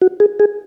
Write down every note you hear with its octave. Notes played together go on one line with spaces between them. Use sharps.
F#4
G#4
G#4